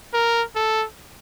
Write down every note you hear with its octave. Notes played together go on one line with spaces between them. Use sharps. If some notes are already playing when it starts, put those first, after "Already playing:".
A#4
A4